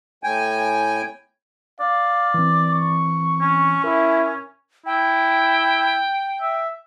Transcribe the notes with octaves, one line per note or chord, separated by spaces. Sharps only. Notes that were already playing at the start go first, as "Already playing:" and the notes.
A2 G5 G#5
D5 F5
E3 C4
C#6
C#4
E4 A#4
E4 G5
E5